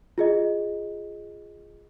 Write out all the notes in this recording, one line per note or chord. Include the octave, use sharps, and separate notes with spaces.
F4 G#4 D#5